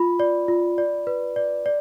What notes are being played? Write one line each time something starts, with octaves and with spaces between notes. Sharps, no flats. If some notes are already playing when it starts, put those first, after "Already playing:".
Already playing: F4 B5
D5
F4
D5
B4
D5
D5